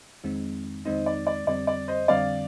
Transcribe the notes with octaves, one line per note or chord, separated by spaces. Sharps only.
F2 D#3 G#3 C4 D#4
F2 D#3 G#3 C4 D#4 C5 D#5
D5
D5
F2 D3 G3 C4 D5
D5
C5 D#5
F2 D3 G3 C4 D5 F5